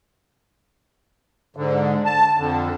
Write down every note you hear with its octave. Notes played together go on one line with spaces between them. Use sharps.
G#2 D3
A5
F2 D3